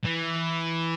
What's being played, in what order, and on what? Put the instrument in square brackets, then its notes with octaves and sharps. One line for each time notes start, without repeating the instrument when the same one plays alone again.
[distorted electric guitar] E3